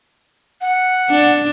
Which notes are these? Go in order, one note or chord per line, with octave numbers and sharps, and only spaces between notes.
F#5
D4